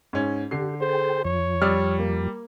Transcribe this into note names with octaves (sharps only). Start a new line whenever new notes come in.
G#2 C#4
D3 G4 C7
G#4 A4 C5 G5
F2 F3 C#5
G3 D5 E6 F6
A#3